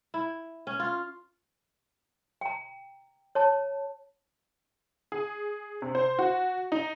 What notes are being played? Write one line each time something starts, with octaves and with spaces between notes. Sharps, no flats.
E4
C#4
F4
G5 A#5
C#5 A5
G#4
C3
C5
F#4
D#4